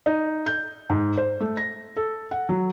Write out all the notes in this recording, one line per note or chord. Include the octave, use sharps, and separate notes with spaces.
D#4
G6
G#2
C5
A3
A#6
A4
F#5
F#3